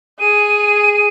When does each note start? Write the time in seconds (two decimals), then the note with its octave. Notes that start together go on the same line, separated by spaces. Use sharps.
0.20 G#4 D#7